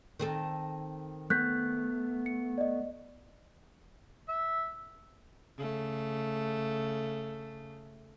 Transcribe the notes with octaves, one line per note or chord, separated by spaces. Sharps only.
D#3 C4 A4
A3 B3 F#6 G6 B6
C#7
D5 D#5
E5
C#3 A3